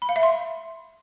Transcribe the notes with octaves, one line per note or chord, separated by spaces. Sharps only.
B5
F5
E5
C6